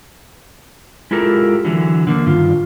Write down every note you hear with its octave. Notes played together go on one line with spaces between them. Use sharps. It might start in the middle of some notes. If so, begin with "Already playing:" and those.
G#3 E4 F4 G4 A4 A#4
D3 E3 F#3
D3 A#3
G2 D#3 F4